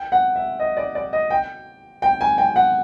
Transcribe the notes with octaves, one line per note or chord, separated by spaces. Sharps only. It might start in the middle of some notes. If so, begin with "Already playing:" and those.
Already playing: G5
F#5
E5
D#5
D5
D5
D#5
G5
G5
G#5
G5
F#5